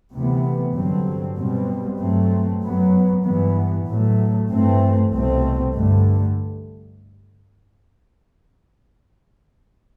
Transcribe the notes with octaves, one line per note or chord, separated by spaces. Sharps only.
D2 C3 E3 B3
G2 D3 F#3 C4
B2 G3 C4
G2 F#3 A3 C4
F#2 F#3 B3
G2 E3 B3
A2 F#3 A3
G2 E3 A3 C4
C2 B2 A3 C4
G2 D3 A3